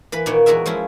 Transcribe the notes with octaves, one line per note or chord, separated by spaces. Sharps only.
E3 B4 B5
A#2 D#3 A#3 C#5 F#5
E2 G#3 F#4 G#4 A#4 E5
F3 G#3 C#4 E4